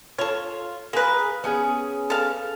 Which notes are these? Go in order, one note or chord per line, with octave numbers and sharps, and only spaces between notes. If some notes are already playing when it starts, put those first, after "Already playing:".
F4 A4 C#5
A#3 G#4 A#4 B4
B3 C#4 G#4
A4 F5